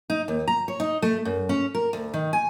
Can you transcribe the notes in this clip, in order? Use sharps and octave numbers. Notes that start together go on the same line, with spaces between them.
D#4
D#2
A#5
C#5
D#4
A3
F#2
C#4
A#4
D2
D#3
G#5